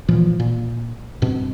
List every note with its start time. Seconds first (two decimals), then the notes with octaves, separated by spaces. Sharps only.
0.09 A#2 E3 F3
0.40 A#2
1.22 G2 B2 C4